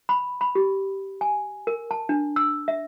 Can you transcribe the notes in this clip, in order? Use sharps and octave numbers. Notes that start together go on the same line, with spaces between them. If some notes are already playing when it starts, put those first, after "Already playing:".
B5
B5
G4
G#5
A#4
A5
D4
E6
E5